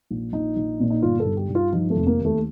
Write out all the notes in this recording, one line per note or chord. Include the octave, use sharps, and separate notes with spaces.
A#1
A#1 D#4
A#1
A#2
D#4
G1 F4
A4
G2
G4
G2
F4
F3 D#4
A3
F1
A#3
D#2
A3